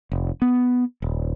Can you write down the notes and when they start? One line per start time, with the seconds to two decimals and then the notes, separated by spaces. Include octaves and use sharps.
0.12 F1
0.42 B3
1.02 D#1